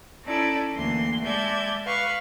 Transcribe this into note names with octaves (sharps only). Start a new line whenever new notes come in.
C#4 D#4 E4 A4 D5
D2 E3 A#3 C6
G#3 D5 E5 A5 G6 G#6
B4 F5 C#6